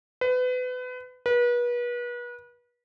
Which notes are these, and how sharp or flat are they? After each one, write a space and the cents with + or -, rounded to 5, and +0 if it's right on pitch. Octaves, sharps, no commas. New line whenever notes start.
B4 +30
B4 -35